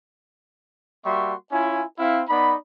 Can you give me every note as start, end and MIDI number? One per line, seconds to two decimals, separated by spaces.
1.05 1.33 55
1.05 1.33 58
1.05 1.33 66
1.05 1.33 76
1.05 1.33 84
1.05 1.33 85
1.51 1.84 61
1.51 1.84 64
1.51 1.84 65
1.51 1.84 80
1.99 2.22 60
1.99 2.22 64
1.99 2.22 77
2.29 2.55 59
2.29 2.55 63
2.29 2.55 74
2.29 2.55 83